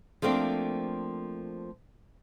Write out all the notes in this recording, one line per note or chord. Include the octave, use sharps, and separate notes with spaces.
F3 A3 A#3 C4 D4